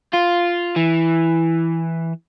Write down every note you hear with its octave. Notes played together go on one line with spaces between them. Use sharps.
F4
E3